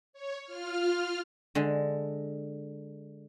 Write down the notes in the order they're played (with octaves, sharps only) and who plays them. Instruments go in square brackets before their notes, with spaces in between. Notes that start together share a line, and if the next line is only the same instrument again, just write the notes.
[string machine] C#5
F4 F6
[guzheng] D3 G#3